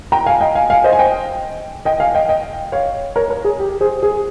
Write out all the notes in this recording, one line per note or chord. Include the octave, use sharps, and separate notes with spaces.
G5 A#5
F5 G#5
D#5 G5
F5 G#5
F5 G#5
C5 D#5
G#5
D#5 G5
D#5 G5
F5 G#5
D#5 G5
D#5 G5
C#5 F5
A#4 C#5
A#4 C#5
G#4
G4
G#4 C5
G#4